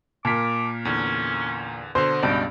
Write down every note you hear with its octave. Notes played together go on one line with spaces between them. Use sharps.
A#2 A#4 A5 D6 B6
E2 D3 C#4
B2 D3 C5
C#2 G2 B2 D5 G5 D7